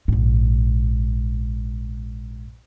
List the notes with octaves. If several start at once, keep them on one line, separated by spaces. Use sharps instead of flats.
A#1 G#2